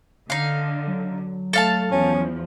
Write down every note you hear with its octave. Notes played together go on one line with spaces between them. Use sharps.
D3 D#4 F5
F#3
A3 A4 F5 A5
E2 F3 C#4